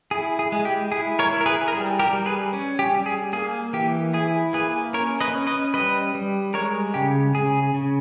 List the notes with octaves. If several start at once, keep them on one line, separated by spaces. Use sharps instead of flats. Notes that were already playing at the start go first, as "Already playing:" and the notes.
E4 G#4
G#4
G#3
G4
E4 G#4
A#4 C#5
E4
A#4
G#4 B4
A#4
G3 G#4
G4 A#4
G3
G#4 B4
C#4
G4
G3
G#4
A#3 G#4
E3 G4
E4 G#4
A#3 G#4 B4
C#4 A#4 C#5
B4 D#5
C#4
B4 D#5
G3 B4 D#5
G3
G#3 A#4 C#5
C#3 G4
C#3 G#4
C#3